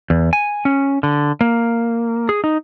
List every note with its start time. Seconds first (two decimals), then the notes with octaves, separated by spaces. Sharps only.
0.10 E2
0.33 G#5
0.65 C#4
1.03 D3
1.41 A#3
2.29 G#4
2.44 D#4